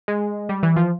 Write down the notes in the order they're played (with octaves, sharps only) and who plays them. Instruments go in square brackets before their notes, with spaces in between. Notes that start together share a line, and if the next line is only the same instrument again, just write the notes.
[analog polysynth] G#3
G3
E3
F3